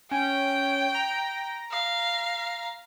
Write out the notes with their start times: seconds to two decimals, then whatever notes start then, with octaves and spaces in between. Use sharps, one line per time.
0.11 C#4 G5
0.95 A#5
1.71 F5